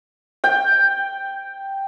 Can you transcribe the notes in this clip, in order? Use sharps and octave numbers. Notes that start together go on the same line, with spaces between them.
G5